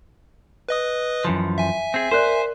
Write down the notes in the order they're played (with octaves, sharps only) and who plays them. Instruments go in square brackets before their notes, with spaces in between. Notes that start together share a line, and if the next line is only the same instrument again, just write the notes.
[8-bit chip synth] B4 D#5 D#6
[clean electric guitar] F#2 E3 F3
[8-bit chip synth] E5 G#5
[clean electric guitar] C4 G#4
[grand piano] A#4 D5 F#6 [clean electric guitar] C5